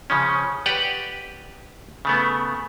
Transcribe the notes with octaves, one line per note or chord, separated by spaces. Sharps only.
C#3 F3 C#4
G4 B4 D5 F#5 G5
C#3 A3 B3